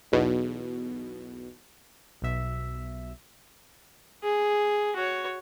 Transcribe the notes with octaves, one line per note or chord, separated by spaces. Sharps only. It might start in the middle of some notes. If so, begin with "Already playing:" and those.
B1 E2 B2
B1 B2 E5
G#4
F#4 C#5